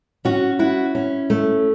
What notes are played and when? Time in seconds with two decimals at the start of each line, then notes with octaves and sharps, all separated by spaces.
0.25 C#4 F#4
0.59 E4 F#4
0.95 C#4
1.30 A3